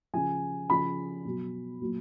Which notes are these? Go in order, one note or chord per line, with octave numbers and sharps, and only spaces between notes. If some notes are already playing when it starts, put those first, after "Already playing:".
C#3 F3 G#5
C#3 F3 B5
B2 F#3
A#2 F#3